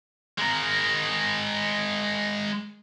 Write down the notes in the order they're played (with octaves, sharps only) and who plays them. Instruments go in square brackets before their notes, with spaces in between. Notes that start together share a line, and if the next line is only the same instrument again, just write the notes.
[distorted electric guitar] G#3 A#4